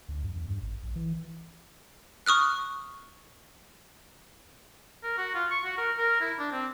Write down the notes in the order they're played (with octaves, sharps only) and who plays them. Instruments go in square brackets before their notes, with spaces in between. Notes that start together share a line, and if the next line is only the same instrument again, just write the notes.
[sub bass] D2
F#2
E2
G2
G#1
A#1
E3
[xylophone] C#6 D#6 F6 F#6
[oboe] A#4
F#4
F4
C#6
F#4
A#4
A#4
E4
D4
C4